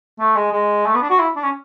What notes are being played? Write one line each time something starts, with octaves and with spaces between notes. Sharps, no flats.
A3
G#3
G#3
A3
B3
D4
F#4
E4
D4
C#4